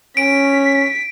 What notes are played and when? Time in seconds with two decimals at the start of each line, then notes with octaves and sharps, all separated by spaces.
0.17 C#4 B6 D7